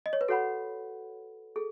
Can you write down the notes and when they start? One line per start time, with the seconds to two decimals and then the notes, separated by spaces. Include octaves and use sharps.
0.06 D#5
0.13 C#5
0.21 B4
0.28 F#4 A4 C#5 F#5 B5
1.56 G#4 A4